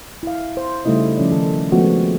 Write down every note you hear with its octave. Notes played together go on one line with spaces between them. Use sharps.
E4 F5
C5
C#3 G3 A3 D#4 E4 D#5
F3 C#4 D5
D#3 A4
F3 G#3 A3 B3 C4 F#4